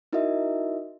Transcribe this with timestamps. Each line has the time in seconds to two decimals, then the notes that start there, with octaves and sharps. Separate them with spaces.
0.13 D#4 E4 F#4 A#4 D#5 E5